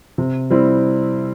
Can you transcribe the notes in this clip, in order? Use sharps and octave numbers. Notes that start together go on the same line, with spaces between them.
C3
G3 C4 E4